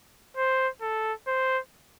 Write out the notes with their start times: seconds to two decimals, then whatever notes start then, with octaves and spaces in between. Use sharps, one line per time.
0.37 C5
0.81 A4
1.27 C5